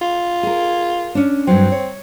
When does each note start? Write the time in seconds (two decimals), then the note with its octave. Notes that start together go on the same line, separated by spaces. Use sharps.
0.02 F4
0.43 G#4 A#4
1.15 C#4 D4
1.47 G2 F#3 C4
1.72 C#5